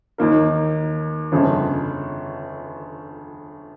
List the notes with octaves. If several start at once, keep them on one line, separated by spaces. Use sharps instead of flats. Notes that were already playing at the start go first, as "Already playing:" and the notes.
D#2 D#3 A#3 D#4 A#4
G1 F2 C#3